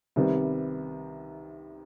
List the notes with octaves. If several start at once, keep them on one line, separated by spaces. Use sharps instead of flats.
C2 C3 D#3 G3 B3